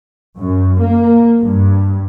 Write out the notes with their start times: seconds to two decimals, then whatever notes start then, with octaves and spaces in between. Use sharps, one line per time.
0.38 F#2
0.81 A#3
1.41 G2